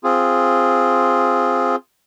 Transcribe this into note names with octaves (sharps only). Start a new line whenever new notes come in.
C4 F4 G#4